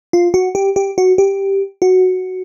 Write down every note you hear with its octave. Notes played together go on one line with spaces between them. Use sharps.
F4
F#4
G4
G4
F#4
G4
F#4